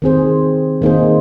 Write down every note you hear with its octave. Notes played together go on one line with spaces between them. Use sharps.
D#3 C4 G#4 C5
D#3 A#3 D#4 G#4 C5